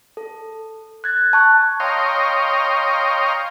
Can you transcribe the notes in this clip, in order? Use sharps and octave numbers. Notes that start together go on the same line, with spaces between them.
A4
F#6 G#6 A6
A5 C#6 F#6
C#5 D#5 F5 G5 A#5 C6